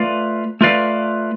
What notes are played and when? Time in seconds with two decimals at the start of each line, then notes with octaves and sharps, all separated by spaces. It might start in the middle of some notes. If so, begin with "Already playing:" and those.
Already playing: A3 F4 B4 D5 F5
0.61 A3 F4 B4 D5 F5